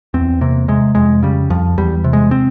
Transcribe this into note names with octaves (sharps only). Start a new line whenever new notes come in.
E2 C4
C3 A#3
C3 G#3
F2 G#3
C#3 G3
F2 F3
E2 G3
C3
G#3
C4